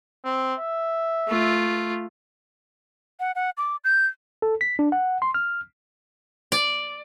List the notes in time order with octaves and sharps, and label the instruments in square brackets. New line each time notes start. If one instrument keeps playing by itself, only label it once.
[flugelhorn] C4
E5
[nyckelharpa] A3 F4
[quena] F#5
F#5
D6
G6
[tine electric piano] A4
B6
D4
F#5
C6
F6
[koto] D5